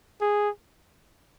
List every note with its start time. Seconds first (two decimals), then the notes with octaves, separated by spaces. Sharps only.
0.21 G#4